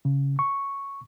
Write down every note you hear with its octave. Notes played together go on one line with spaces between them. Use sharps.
C#3
C#6